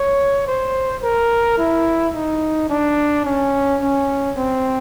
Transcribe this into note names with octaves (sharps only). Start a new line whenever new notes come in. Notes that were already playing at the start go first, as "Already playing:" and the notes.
Already playing: C#5
C5
A#4
E4
D#4
D4
C#4
C#4
C4